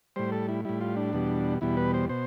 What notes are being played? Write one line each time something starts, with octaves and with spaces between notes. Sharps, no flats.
A2 G3 C5
A4
E4
A2 G3 E4
F4
D4
E2 B2 G3
E2 B2 G3 E4
B4
C5
B2 C5